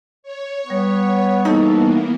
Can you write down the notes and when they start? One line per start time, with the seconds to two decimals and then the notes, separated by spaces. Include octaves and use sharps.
0.23 C#5
0.66 G3 B3 C#6
1.45 G#2 E3 A#3 B3 D#4 A4